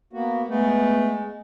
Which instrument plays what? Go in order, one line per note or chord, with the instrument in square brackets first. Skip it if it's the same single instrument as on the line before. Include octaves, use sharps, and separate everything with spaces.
[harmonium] A#3 B3 F#4
[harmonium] G#3 [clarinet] A3 [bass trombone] B3